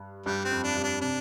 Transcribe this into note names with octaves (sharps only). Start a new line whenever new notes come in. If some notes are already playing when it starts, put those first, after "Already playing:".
Already playing: G2
G2 G3
C4
F2
D4
G2
D4
C3 D4